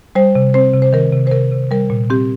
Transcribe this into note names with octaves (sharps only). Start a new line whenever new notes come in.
G3 C5
C3
C4 C5
C3
C5
D#3 A#4
C3
C5
C3 A#4
C3
G3 A#4
A#2
C4 G4